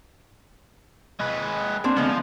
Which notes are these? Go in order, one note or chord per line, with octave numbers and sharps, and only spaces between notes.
G#3 B4
A#3 C4 D4
D3 F3 G#3 B3